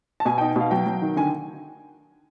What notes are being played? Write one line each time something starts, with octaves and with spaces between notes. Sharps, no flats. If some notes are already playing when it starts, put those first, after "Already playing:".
A5
B2 G#5
D#4 G5
B2 F5
F#3 G5
F#3
D#3
D3 G#5